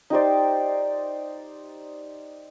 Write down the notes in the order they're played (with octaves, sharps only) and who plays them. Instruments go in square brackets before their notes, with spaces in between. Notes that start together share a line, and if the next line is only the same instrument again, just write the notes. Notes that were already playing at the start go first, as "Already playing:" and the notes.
[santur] D#4 G4 C5 D5